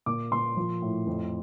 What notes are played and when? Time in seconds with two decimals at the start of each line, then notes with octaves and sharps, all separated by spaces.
0.06 A#2 D6
0.32 A#2 C6
0.57 F3
0.82 A2
1.07 F2